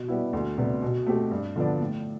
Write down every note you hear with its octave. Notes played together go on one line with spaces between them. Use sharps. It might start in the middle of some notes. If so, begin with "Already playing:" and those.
Already playing: B2
G3 B3 E4
D2
C3 G3 B3
B2
A3 C4 G4
G2
D3 F3 B3 D4
A2